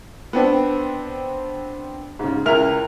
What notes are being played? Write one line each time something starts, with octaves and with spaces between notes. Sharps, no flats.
B3 C4 D4
G#2 C#3
C#2 E4 A#4 F6 F7